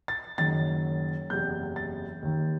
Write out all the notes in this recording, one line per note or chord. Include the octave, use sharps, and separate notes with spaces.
A6
F#1 F#2 D#3 A6
F#1 E2 C3 G6
A6
D#2 D#3